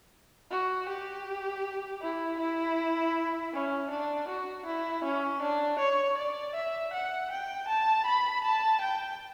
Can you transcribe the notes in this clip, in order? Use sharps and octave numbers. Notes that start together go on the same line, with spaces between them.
F#4
G4
E4
E4
C#4
D4
F#4
E4
C#4
D4
C#5
D5
E5
F#5
G5
A5
B5
A5
G5